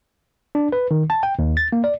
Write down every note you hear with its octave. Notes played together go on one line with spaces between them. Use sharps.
D4
B4
D#3
A5
G5
D#2
A6
A#3
D5